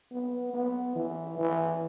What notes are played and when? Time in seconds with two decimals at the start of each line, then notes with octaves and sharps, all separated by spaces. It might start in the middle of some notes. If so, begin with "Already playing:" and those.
0.11 B3
0.53 B3
0.95 E3
1.38 E3